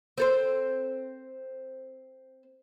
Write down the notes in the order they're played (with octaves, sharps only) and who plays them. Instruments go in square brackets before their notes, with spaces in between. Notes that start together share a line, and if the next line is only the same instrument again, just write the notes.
[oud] C4 A4 C5